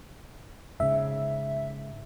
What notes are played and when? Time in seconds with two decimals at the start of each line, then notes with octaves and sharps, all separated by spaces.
0.80 G#2 C#3 E5